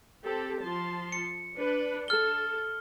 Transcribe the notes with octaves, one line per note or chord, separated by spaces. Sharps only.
C4 G4 A4
F3 A5 C6
C#7
D4 B4
A4 F6 G7